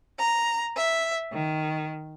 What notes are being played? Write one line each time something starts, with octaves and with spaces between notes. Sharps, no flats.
A#5
E5
D#3